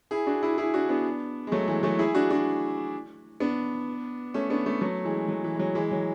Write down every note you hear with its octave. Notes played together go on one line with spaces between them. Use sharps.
E4 G#4
D4 F#4
E4 G#4
E4 G#4
D4 F#4
B3 D4
G#3
F#3 A3
E3 G#3
F#3 A3
E4 G#4
D4 F#4
D4 F#4
B3 D4
A3 C#4
B3 D4
A3 C#4
F#3 A3
E3 G#3
F#3
E3
G#3
F#3
E3 G#3
F#3